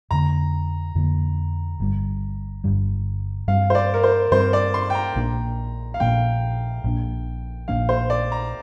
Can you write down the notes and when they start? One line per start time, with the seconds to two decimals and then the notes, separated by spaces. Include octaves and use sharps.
0.11 F2 D3 A#3 A#5
0.95 F2 D3 A#3
1.80 G1 G2 G3
2.64 G1 G2 G3
3.48 G2 G3 C4 F5
3.70 C5
3.75 D5
3.94 A#4
4.04 C5
4.31 G2 G3 C4 C5
4.53 D5
4.74 C6
4.90 G5
4.95 A#5
5.15 A#1 A#2 A#3 D4
5.94 F5
6.00 A#1 A#2 A#3 D4 G5
6.84 A#1 A#2 A#3 D4
7.68 A#1 A#2 A#3 D4 F5
7.89 C5
8.10 D5
8.32 A#5